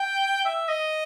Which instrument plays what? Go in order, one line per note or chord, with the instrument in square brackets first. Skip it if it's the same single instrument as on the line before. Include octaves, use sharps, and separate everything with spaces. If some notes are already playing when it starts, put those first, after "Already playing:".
Already playing: [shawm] G5
E5
D#5